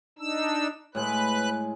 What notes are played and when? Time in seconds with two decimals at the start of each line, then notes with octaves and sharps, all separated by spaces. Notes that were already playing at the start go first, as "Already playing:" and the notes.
0.19 D4 D#4 E6
0.95 A2 G#3 B4 F#6